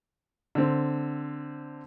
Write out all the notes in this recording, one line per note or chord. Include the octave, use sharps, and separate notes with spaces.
D3 C4